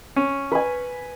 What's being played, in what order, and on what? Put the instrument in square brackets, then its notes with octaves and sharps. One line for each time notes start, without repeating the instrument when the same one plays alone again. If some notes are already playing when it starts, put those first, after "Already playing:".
[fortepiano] C#4
[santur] B4 G#5